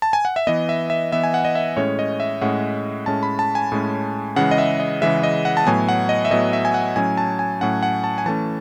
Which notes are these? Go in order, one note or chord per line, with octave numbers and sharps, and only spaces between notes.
A5
G#5
F#5
E5
E3 B3 D#5
E5
E5
E3 B3 E5
G#5
F#5
D#5
E5
A2 G#3 C#4 C#5
D#5
E5
A2 G#3 C#4 F#5
A2 G#3 C#4 A5
B5
A5
G#5
A2 G#3 C#4
C#3 E3 G#3 F#5
D#5
E5
D#5
C#3 E3 G#3 E5
D#5
F#5
A5
A2 F#3 B3 G#5
F#5
D#5
E5
A2 F#3 B3 D#5
E5
G#5
F#5
A2 F#3 C#4 G#5
A5
G#5
A2 F#3 C#4 F#5
F#5
A5
G#5
E3 A3 C#4 A5